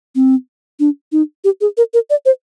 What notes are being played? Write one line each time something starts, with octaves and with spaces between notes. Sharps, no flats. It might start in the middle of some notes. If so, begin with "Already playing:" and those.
C4
D4
D#4
G4
G#4
A#4
A#4
D5
C5